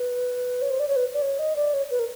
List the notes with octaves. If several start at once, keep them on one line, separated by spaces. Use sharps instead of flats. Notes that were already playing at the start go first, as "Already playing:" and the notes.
Already playing: B4
C#5
C5
D5
C#5
B4
D5
C#5
D#5
D5
C#5
B4
A#4